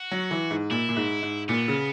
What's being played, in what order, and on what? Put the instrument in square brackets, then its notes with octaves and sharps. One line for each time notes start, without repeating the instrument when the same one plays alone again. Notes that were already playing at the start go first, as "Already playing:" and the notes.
Already playing: [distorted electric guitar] F#4
[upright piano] F#3
E3
G#2
[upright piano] A#2 [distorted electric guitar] E4
[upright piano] A#2
G#2
G#2
[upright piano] A#2 [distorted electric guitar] B3
[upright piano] C#3